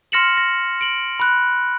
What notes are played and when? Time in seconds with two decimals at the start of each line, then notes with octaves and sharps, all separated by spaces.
0.12 C6 F6 A#6 C#7 E7 F#7
0.37 A#6
0.81 D7 F#7
1.20 B5 F#6